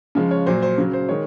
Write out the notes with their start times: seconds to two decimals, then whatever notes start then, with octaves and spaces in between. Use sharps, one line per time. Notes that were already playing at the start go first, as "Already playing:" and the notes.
0.15 C#3 F3 G#3
0.31 C#5
0.46 A#2 F#3 C5
0.62 C5
0.78 C#3 F#3
0.93 C5
1.09 D#3 G#3 C#5